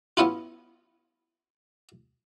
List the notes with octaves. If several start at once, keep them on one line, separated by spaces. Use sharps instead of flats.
B3 C#4 E4 F4